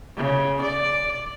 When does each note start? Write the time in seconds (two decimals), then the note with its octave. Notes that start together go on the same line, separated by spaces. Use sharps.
0.16 C#3
0.61 D5